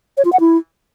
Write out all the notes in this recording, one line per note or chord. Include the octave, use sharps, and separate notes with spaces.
C#5
F4
F#5
E4